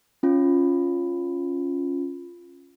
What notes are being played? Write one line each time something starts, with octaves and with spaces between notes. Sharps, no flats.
C#4 F4